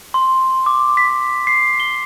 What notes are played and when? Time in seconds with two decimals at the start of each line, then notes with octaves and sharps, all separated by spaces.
0.14 C6
0.66 D6
0.97 B6
1.47 C7
1.80 G7